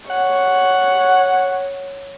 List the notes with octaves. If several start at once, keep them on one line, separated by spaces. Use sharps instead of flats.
C#5 F#5